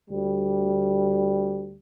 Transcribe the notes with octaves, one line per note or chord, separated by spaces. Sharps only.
D2 G3